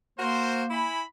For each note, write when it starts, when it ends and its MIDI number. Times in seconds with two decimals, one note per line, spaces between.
0.19 0.87 58
0.19 0.63 66
0.19 0.63 70
0.19 0.63 72
0.71 1.03 64
0.71 1.03 80
0.71 1.03 83